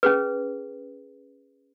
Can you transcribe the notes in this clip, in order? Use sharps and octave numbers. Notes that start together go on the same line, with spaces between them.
C#4 G#4 B4